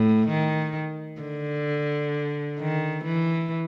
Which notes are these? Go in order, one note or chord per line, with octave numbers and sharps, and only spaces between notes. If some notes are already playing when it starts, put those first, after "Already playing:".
Already playing: A2
D#3
D3
D#3
E3